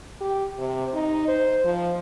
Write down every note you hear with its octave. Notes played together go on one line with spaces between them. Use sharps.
G4
C3
D#4
C5
F3